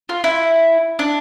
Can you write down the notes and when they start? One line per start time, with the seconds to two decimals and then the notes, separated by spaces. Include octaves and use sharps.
0.09 F4
0.24 E4
0.99 D4